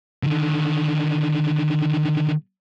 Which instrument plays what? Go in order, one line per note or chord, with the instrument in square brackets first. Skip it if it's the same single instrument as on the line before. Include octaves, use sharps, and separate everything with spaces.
[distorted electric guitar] D3 D#3